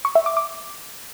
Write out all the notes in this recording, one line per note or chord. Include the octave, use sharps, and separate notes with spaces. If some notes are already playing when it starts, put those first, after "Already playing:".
C#6
E5
D6
D6